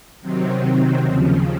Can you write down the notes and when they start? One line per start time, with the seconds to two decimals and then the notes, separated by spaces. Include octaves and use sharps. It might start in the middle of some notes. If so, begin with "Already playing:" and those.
0.22 C3 D#3 F#3 C4
1.03 D#2 C#3 F3